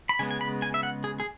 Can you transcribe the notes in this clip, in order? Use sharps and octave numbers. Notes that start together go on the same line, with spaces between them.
B5
C#3 G#3 B3 G#5
G#5
B5
G#5
E5
F#5
G#4
G#4